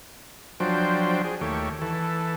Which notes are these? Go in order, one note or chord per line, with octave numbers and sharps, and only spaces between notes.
F3 F#3 D4 C5 G5
G#4
D#2 A3 G4 C#5
E3 A4